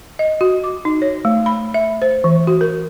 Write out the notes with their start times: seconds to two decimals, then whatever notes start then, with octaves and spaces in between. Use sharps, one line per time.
0.19 D#5
0.41 F#4
0.64 D6
0.85 D#4
1.02 C#5
1.25 A3
1.46 B5
1.74 E5
2.02 C5
2.24 E3
2.47 F#4
2.61 A#4